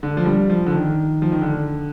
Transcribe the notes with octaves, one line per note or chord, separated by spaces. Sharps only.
D3
F3
G3
F3
D3
D#3
F3
D#3
D3